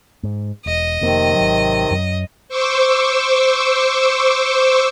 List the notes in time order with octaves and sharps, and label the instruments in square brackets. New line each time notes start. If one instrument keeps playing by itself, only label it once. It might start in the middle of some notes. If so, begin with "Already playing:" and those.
[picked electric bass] G#2
[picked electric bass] E1 [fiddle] D#5
[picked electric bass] F1 F2 A#3 [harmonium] C3 D#3 C4
[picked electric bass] G#1 F#3
F#2 F#3
[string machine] C5 C#6 D6 E6